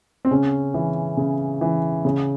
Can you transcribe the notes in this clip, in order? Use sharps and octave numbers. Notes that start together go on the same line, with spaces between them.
C4
C#3 C#4
E3
C#3
E3
C#3